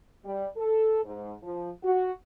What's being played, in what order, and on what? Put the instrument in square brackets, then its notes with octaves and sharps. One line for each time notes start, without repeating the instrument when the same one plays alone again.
[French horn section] G3
A4
G#2
F3
F#4